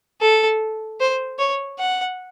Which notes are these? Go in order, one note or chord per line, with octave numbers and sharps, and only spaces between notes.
A4
C5
C#5
F#5